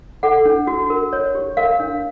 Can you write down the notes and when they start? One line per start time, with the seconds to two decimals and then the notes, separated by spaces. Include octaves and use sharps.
0.23 A4 F#5
0.45 D4
0.67 F#4
0.90 A#4
1.13 C#5
1.35 G4
1.57 A#4 F5
1.80 D4